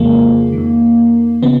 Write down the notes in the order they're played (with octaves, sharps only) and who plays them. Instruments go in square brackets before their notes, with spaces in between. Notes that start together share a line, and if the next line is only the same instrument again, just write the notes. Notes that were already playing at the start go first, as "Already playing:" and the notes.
Already playing: [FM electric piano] F2 C#3 F3 G#3 A#3
D#3
F2
C#3 F3 B3